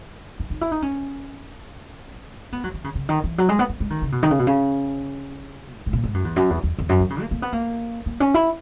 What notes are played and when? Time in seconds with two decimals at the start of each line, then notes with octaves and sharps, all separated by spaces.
0.40 D#4
0.50 D#4
0.61 E4
0.72 D#4
0.82 C#4
2.53 B3
2.64 F#3
2.74 E3
2.84 C#3
2.95 C#3
3.09 D#3
3.24 E3
3.38 F#3
3.49 G#3
3.59 B3
3.69 B3
3.80 G#3
3.90 D#3
4.02 C#3
4.12 B2
4.23 D#3
4.31 C#3
4.39 B2
4.47 C#3
5.79 F#2
5.86 G#2
5.93 A#2
6.04 G#2
6.14 F#2
6.25 E2
6.36 F#2
6.50 E2
6.64 E2
6.79 E2
6.89 F#2
7.00 E3
7.10 C#3
7.21 A#3
7.31 A#3
7.42 B3
7.53 A#3
8.06 A#3
8.20 C#4
8.34 E4